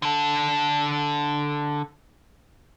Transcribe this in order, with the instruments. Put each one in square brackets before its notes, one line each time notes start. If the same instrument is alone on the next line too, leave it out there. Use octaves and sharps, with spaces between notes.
[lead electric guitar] D3 A4